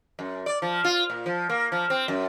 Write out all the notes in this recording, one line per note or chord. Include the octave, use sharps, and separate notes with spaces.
F#2
D5
F3
F4
A#2
F3
A#3
F3
C4
F#2